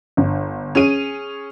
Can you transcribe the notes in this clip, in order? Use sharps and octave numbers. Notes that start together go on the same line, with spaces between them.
G1
C#4 G#4 D#7